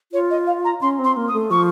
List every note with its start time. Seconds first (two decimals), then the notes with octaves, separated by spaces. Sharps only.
0.12 F4 C#5
0.30 D#5
0.47 F5
0.65 A#5
0.81 C#4 C6
0.99 C4
1.04 C6
1.17 A#3
1.28 D#6
1.33 A3
1.51 F3 C#6